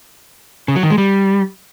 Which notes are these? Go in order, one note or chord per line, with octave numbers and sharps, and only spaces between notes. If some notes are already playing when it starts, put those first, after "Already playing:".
C#3
F#3
D#3
G#3
G3